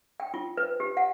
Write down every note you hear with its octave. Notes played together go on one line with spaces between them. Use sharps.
G5
F4
B4
G4
F#5